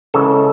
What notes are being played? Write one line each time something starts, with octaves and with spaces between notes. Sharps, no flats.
C#3 E3 G#3 A4